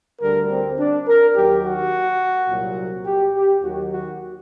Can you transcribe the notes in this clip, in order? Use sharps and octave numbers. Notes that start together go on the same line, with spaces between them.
D2 D3 G3 A#4
C4
D4
A#4
D#2 D#3 F#3 G4
F#4
C2 A#2 F#3
G4
G4
D#2 D#3 F#3 F#4
F#4